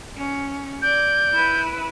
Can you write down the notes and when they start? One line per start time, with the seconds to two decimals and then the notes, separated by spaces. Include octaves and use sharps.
0.17 C#4
0.82 D5 G6
1.33 E4 B4